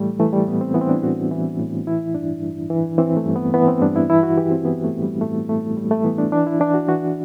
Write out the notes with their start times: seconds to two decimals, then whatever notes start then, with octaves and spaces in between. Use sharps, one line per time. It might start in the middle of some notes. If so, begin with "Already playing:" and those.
Already playing: A2 E3 G3 A3
0.20 E3 A3
0.33 G3
0.48 A2 B3
0.61 C4
0.74 E3 B3
0.81 C4
0.89 D4
0.96 E4
1.03 A2 F#4
1.31 E3
1.59 A2
1.87 E3 E4
2.15 G2 D4
2.42 G2
2.70 E3
2.98 E3 C4
3.17 A3
3.26 G2
3.36 B3
3.54 E3 B3
3.68 C4
3.82 G2 D4
3.96 E4
4.10 E3 E4
4.23 F#4
4.37 E3 G4
4.51 C4
4.65 E3 B3
4.84 A3
4.93 A2
5.03 G3
5.21 A2 A3
5.49 A2 A3
5.76 A2 G3
5.91 A3
6.04 E3 B3
6.18 D4
6.32 E3 D4
6.47 E4
6.60 E3 D4
6.74 F#4
6.88 E3 F#4